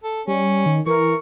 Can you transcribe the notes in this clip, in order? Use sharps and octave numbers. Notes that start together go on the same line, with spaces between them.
A4
G3 C#4
D#3
E3 A#4 C#6